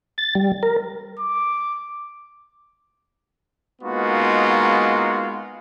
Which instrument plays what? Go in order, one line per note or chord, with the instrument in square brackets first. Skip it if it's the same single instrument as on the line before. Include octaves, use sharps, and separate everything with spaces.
[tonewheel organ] A6
G3
A#4
[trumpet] D6
[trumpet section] G#3 A#3 B3 D#4 F4 F#4